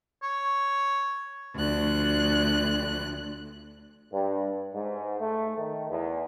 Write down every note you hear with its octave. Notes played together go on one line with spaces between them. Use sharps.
C#5
D2 F3 F#6
G2
G#2
A3
D#3
E2